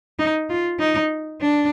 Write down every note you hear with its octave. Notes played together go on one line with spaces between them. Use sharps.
D#4
F4
D#4
D4